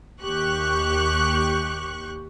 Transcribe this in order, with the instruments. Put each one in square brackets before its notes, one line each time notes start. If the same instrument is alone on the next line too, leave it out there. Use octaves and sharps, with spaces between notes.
[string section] D#2 G4 C#6 F#6